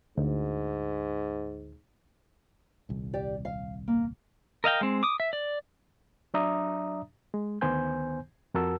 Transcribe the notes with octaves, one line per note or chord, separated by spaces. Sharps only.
D2 G#2
D#1 C2
G4 D5
F5
A#3
A#4 D#5 F5 G5
G#3 C4
D6 D#6
E5
D5
F#3 D4 D5 E5 A#5 D#6
G#3
D2 D#3 B3 C5 G#5 G6
F2 F#4 A#4 A5 E6